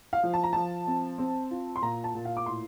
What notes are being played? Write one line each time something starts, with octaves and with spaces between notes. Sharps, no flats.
F5
F3
A5
A#5
F3 A5
C4
C4
F4
C6
A#2 A#5
A5
A#2
F5
D6
A2 C6